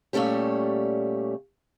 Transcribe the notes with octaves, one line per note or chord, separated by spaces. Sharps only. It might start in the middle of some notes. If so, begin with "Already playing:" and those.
A#2 G3 A3 C#4 G4